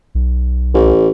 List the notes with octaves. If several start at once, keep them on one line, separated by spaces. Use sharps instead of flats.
B1
A1